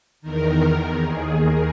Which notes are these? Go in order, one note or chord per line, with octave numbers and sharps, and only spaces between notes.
E2 D#3 A#4
D#2 D#3 G#4
A#4